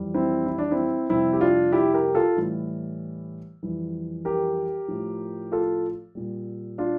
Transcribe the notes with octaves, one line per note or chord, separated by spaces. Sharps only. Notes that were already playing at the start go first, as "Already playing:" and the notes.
Already playing: F2 E3 G3
C4 E4
E4
D4
C4 E4
F2 C3 G3 C4 E4
G4
D4 F4
E4 G4
G4 A#4
F4 A4
A2 E3 G3
F2 E3 G3
G4 A#4
A2 F3
F4 A4
A#2 G3
D4 F4